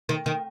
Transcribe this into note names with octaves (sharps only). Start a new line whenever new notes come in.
D#3
D#3